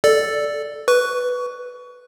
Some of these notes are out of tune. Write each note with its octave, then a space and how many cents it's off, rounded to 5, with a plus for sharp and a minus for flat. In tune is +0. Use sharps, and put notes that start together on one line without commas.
A4 +0 D5 +0
B4 +0 C#6 +25